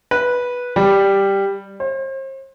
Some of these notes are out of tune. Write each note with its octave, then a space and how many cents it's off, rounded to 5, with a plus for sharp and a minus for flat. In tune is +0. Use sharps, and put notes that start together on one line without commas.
B4 -10
G3 +5
C5 +40